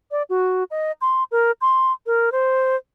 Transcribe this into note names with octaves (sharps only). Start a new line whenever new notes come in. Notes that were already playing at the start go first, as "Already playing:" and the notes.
D5
F#4
D#5
C6
A#4
C6
A#4
C5